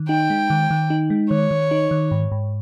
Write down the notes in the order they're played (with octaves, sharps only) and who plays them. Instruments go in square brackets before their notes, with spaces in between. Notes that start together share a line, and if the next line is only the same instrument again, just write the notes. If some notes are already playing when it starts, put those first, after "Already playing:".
Already playing: [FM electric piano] D#3
[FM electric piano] D#4 [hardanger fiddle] G5
[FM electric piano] G#3
D#3
D#3
D#4
G#3
[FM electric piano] D#3 [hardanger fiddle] C#5
[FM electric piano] D#3
D#4
D#3
G#2
G#2